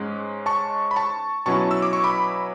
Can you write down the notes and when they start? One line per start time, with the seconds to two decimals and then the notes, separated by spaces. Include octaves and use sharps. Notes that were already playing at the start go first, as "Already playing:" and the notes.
Already playing: G#2 G#3 C#4
0.46 A5 C#6
0.91 B5
0.96 A5 C#6
1.46 B2 F#3 C#4 E4 A5 C#6
1.71 E6
1.82 D6
1.93 C#6
2.04 B5 D6